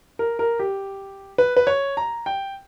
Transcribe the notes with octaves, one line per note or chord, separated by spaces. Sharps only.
A#4
A#4
G4
B4
B4
C#5
A#5
G5